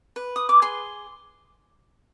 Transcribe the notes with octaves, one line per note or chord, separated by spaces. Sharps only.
B4
D#6
D6
G#4 C6